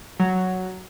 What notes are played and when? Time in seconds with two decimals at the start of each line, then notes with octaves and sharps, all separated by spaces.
0.20 F#3